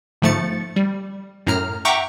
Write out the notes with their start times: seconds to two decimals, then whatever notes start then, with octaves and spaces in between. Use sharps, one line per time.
0.22 G1 G#2 F3 A3 A6 C#7
0.76 G3
1.47 F#2 A2 A#5 F6
1.85 E5 F#5 G5 A#5 C#6 D6